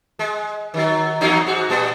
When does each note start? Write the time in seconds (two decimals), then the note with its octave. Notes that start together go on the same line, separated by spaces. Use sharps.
0.19 G#3
0.74 D#3 F#3
1.21 E2 F#3 D#4
1.47 G#2 F#4
1.69 A#2 G3 B3